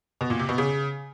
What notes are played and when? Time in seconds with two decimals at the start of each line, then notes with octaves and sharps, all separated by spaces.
0.21 B2
0.30 A#2
0.39 C3
0.49 B2
0.58 C#3